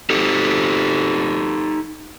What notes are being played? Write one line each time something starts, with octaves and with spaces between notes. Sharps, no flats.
D#4 G4 A4